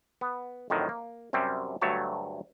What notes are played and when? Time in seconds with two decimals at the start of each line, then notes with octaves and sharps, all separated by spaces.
0.21 B3
0.70 F2 A2 D3 D#3 F#3
0.89 A#3
1.33 F#2 C3 G3 C4 C#4
1.81 D2 G2 F#3 A3 C#5 A5